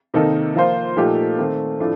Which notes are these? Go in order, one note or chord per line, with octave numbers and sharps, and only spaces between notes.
C3 D#3 A#3 D#4 A4
F3 A#3 F4 C5
A#2 F3 A3 D#4 G4
D#3 A3 C4
A2 F3 A3 D4